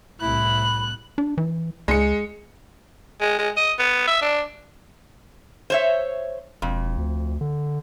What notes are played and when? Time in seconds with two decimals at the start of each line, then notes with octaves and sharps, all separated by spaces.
0.21 C2 A2 E4 B5 F#6
1.18 D4
1.38 E3
1.88 C#2 G#3 C#7
3.21 G#3
3.38 G#3
3.57 D#5
3.79 B3
4.07 E5
4.21 D4
5.70 C5 C#5 E5
6.62 E1 F2
6.98 D2
7.41 D3